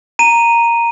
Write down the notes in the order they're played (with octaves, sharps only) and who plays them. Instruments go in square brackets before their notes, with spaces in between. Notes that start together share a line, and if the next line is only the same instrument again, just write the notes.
[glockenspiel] A#5 D#7